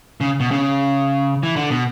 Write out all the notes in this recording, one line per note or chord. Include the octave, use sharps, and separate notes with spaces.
C#3
B2
C#3
E3
D3
B2